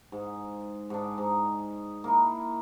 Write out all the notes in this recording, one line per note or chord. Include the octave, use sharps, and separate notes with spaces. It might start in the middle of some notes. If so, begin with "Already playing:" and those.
G#2
G#2 D4
G#2 D#4
A#3 D#4 E4